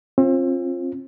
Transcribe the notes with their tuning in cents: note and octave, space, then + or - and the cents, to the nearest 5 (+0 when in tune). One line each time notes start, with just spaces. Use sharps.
C4 +35 F4 +0